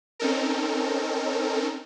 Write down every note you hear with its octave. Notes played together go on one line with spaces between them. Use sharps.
C4 C#4 D#4 A4 A#4